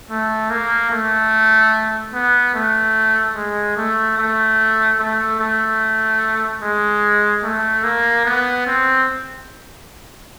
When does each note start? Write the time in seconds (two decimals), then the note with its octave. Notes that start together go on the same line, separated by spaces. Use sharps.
0.10 A3
0.50 A#3
0.91 A3
2.13 B3
2.54 A3
3.35 G#3
3.76 A3
4.17 A3
4.99 A3
5.39 A3
6.62 G#3
7.43 A3
7.83 A#3
8.25 B3
8.66 C4